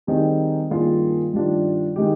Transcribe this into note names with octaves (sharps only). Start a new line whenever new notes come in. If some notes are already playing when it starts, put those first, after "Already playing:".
D#3 G3 C4 D#4 G#4
G2 D#3 A#3 F4 G#4
G2 D#3 G3 D4 F4
D#3 G#3 D#4 G4